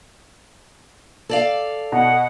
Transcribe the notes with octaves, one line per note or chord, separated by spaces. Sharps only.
A4 D5 F5
B2 F#5